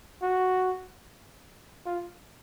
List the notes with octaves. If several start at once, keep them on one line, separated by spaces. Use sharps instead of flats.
F#4
F4